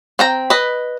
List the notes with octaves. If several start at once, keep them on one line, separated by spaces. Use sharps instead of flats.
C4 G5 A#5
B4 D#5